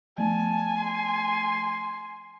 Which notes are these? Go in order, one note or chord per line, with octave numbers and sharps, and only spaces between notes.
F3 A3 G#5 A5
C6